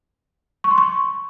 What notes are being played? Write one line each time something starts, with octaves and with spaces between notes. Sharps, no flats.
C#6
C6
C#6